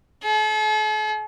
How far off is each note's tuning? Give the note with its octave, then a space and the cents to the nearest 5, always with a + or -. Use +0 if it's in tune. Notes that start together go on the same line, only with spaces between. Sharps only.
A4 -45